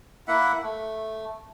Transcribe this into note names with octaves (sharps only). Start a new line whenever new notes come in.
A#3 E4 E5 F#5
A3